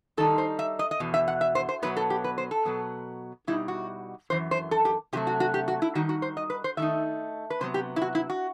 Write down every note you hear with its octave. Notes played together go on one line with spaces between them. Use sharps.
D#3 G3 D#4 A4
C5
E5
D#5
D#5
E2 B2
E5
F#5
E5
C5
C5
B2 F#3 B3 B4
A4
G4
B4
C5
A4
B2 F#3 B3
B2 G3 D#4 E4
F#4
F#2 E3 C5
C5
A4
G4
C3 F#3 A3 G4
F#4
F#4
G4
F#4
E4
D#3 G3 D#4 F#4
F#4
C5
D#5
B4
C5
D#3 A3 D#4 E5
B4
C3 F#3 B3 C5
G4
E4
F#4
E4
F#4